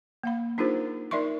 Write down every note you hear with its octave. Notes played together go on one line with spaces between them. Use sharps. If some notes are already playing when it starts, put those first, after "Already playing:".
A#3 F5 B5
D4 D#4 F4 G#4 A#4 C5
D#4 A#4 D5 E5 C6 C#6